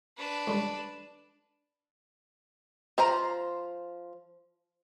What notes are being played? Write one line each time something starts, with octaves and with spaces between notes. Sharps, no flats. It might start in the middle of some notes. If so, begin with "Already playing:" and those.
D4 B4
C#2 D3 G3
F3 C5 A#5